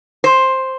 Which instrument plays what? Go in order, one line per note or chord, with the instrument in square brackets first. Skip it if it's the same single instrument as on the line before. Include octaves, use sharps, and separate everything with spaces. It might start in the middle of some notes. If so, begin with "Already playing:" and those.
[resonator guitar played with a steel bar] C5